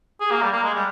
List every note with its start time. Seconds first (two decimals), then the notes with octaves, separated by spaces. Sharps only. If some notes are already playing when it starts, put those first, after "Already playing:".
0.20 G#4
0.31 A#3
0.42 G3
0.52 A#3
0.63 G#3
0.74 G3